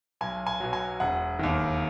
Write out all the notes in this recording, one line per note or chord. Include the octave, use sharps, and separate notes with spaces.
B1 G#5
G#5
B2 F#3
G#5
E1 F#5
D#2 D#3